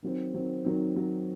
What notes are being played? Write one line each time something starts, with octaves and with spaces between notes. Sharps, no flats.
D#3 F#3 C4
D#3 F#3 C4
D#3 F#3 C4
D#3 F#3 C4